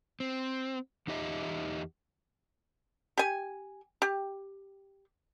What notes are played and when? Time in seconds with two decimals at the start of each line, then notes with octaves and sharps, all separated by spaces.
0.20 C4
1.07 E2 D#4 G4 D#5 E5
3.18 G4 G#5
4.02 G4